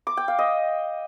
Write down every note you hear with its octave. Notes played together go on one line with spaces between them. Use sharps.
D6
G5
F5
D#5